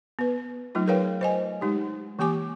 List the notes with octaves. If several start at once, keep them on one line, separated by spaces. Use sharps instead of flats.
B3 B4
F#3 A3 D#4 F4
G#4 A#4 B4 C#5 F5 G5
C5 D#5 G#5
G#3 D#4 G4
E3 A#3 G4 G#5 D6